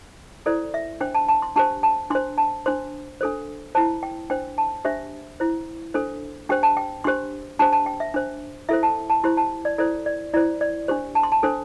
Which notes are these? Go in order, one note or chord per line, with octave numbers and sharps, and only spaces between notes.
E4 A4 C5 D5
E5
D4 C5 G5
A5
A5
C6
D4 G4 C5 A5
A5
D4 C5 C6
A5
D4 C5 C6
D4 A4 C5
E4 C5 A5
G5
D4 C5 G5
A5
D4 G4 C5 E5
E4 C5
D4 A4 C5
D4 G4 C5 G5
A5
G5
D4 G4 C5 C6
D4 G4 C5 A5
A5
G5
E5
D4 C5
E4 A4 C5 E5
A5
A5
E4 G4 C5 C6
A5
D5
E4 A4 C5 D5
D5
E4 C5 D5
D5
D4 G4 C5
A5
C6
A5
D4 A4 C5